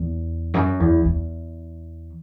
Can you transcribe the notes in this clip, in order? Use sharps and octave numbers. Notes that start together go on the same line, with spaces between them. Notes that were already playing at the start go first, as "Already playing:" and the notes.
Already playing: E2
F#2
E2
E2